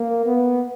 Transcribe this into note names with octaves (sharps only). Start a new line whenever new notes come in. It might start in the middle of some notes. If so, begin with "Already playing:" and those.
Already playing: A#3
B3